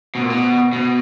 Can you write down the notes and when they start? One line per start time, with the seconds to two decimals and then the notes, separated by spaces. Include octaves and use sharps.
0.15 B2
0.23 A#2
0.30 B2
0.73 B2